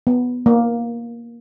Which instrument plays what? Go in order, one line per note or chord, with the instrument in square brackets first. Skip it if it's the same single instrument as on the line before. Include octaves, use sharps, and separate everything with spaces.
[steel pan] B3
A#3